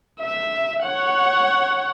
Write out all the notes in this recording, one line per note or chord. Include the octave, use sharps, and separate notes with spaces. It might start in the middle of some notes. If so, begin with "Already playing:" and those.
E5
C#5 F#5